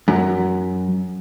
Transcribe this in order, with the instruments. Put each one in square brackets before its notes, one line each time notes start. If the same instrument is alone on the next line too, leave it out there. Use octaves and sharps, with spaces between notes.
[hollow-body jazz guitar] F#2